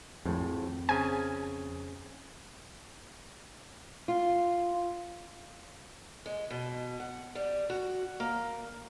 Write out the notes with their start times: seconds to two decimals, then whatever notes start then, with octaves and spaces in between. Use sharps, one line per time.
0.25 G#1 F2 A2
0.89 C#3 C4 G#5
4.08 F4
6.26 G#3
6.51 B2
7.00 F#5
7.35 G3
7.70 F#4
8.20 A#3